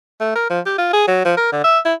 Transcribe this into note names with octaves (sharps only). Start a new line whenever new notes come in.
A3
A#4
F3
G4
F4
G#4
F#3
F3
A#4
D3
E5
E4